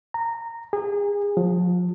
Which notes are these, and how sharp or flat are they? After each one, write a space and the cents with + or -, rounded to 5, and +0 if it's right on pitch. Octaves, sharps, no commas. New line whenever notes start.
A#5 -15
G#4 -30
F3 +30